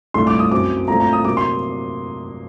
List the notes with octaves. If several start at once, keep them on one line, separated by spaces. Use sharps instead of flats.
C2 A#2 A3 C6
D6
D#6
F#2 F#3 C4 D6
A#2 A3 C4 A#5
A#5
D#6
C3 F#3 A#3 D6
C6